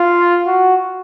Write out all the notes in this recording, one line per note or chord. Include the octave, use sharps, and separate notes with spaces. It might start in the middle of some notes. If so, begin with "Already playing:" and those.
Already playing: F4
F#4